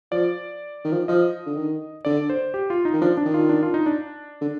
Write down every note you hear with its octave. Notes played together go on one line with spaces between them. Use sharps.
F3 D5
D#3
F3
F3 D#5
D3
D#3
D3 D5
C5
G4
F4
D#4
D#3
F3 D4
D4
D#3
F4
D4
F4
D#4
D4
D3